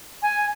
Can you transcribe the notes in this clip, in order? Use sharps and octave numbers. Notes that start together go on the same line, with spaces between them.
G#5